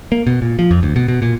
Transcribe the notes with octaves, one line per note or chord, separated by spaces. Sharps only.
A#3
B2
A#2
F3
F2
D2
B2
B2
A#2